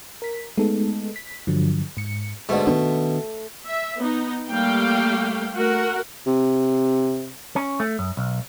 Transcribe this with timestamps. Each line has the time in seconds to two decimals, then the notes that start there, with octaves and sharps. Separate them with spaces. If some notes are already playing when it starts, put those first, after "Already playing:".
0.22 A#4 B6
0.58 G#3 A3 B3 D#4 A4
1.16 B6
1.47 G2 D3 F3 F#3
1.97 G#2 C#7
2.49 G#2 B2 D3 A3
2.67 B2 D#3 B3 D4
3.66 E5
3.98 B3 D#4
4.50 G3 A3 A#3 F5 G5
5.54 A3 F#4 A#4 F#5
6.27 C3
7.56 C#4
7.80 A3
7.99 F#2
8.17 B1